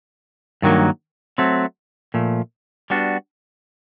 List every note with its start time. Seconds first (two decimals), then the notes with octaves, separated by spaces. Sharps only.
0.62 G2 D#3 F#3 A#3
1.38 F#3 A3 C4
2.14 A#2 F3 A3
2.90 G3 B3 D4 F#4